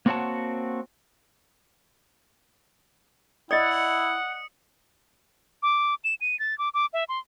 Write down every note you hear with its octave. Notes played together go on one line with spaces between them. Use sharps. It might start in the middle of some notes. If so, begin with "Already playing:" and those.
A#3 C4 F#4 C#5 F#5 A5
E4 D5 D#5 F#5 D#6 C#7
D6
E7
D#7
A6
D6
D6
E5
C6